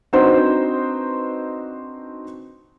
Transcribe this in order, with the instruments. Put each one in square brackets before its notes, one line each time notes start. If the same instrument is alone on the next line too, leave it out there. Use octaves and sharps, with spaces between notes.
[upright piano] C4 D4 D#4 F#4 B4 C5